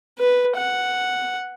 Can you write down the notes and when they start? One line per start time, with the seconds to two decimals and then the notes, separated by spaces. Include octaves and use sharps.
0.19 B4
0.57 F#5